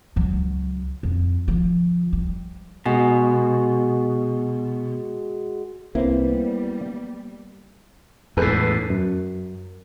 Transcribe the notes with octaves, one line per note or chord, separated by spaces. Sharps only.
C#2 F#3
F2
D3 F3
G3
B2 G#3 F#4
C2 C3 G3 A#3 C4 E4 B4 C5
B3
E2 A2 G#3 A4 B4
F#2